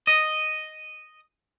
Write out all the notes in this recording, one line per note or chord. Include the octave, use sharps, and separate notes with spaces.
D#5